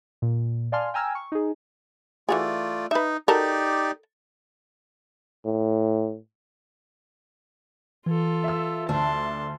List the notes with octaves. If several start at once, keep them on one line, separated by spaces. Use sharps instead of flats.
A#2
D5 F5 G#5 A5 C6 F6
G5 G#5 A#5 E6 F6 G#6
C#6
D#4 G#4
E3 A3 F4 F#4 G#4 D5
D#4 B4 E5
D#4 F#4 G4 A4 A#4 D5
A2
E3 F4 A4
E5 E6
D2 A3 D4 A5 C6